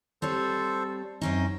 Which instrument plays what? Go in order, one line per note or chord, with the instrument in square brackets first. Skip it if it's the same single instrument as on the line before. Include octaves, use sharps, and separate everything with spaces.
[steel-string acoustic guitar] G3 C4 C#5 [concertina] A4 C5
[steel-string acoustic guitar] F#2 C4 D#4 [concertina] C#4